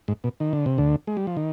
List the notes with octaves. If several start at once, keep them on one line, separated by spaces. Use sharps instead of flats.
G#2
B2
D#3
D3
C3
D2 D3
G#3
G3
F3
D#3